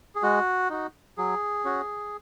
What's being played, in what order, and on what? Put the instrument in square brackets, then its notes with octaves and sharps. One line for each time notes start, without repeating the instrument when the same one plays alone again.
[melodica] G#4
G#3 F#4
D#4 F#4
F#3 G#4
C#4 F#4